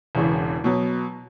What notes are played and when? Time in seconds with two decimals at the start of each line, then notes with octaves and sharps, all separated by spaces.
0.15 E1 E2 C#3 E3
0.64 B2 F#3 B3